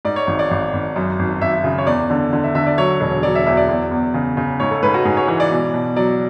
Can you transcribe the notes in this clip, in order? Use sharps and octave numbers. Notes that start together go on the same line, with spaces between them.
G#2 D5
C#5
G#1
D5
G#1
G#1
F#2
G#1
G#1 E5
C#3
C#5
E2 D5
D3
D3
E5
D3 E5
D5
F#3 C#5
E1
F#3 D5
E5
E2 E5
D5
E2
E2
C#3
C#3
G#2 C#5
A4
G#2 B4
F#4
G#2 G#4
C#5
E3 C#5
D5
B2
B2
F#3 D5